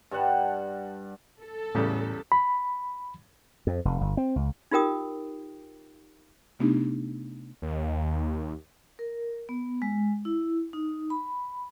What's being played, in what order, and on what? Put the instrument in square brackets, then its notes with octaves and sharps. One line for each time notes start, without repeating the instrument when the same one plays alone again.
[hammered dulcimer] G2 G3 F#5 A5
[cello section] A4
[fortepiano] E2 C#3 G3 [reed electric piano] A2
[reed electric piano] B5
[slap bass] F2
F1
G1
C4
C#2
[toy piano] D#4 F4 G4 A#4 G5 D#6
[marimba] C3 A3 B3 D4 D#4 G4
[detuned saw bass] D#2
[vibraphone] A#4
B3
G#3
E4
D#4
B5